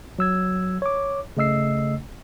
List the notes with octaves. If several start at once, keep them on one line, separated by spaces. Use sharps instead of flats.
F#3 E6 G#6
C#5 D6
C#3 A3 D#5 E6 C7